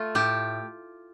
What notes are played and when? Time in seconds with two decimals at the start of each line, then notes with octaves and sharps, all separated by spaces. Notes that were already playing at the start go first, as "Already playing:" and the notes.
Already playing: A3 F4
0.15 A2 G4